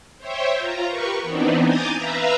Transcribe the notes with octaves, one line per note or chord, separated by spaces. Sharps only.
C5 C#5 E5 G5
F4 A#5
G4 A#4 B4 C#6
E3 B3 C4 D4 D#4
G#5 A#5 D6 D#6 G6 A6
B4 E5 F5 A#5